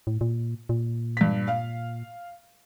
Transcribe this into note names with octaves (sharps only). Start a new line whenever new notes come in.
A2
A#2
A#2
G2 B6
F5